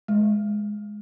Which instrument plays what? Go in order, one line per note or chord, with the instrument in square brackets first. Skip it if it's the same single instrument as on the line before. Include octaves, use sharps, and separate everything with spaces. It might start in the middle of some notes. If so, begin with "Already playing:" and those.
[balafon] G#3